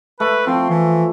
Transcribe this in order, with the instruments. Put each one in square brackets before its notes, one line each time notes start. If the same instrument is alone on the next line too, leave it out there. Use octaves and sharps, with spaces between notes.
[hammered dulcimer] A3 [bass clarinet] B4
[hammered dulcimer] F3 [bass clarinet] C4
[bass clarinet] E3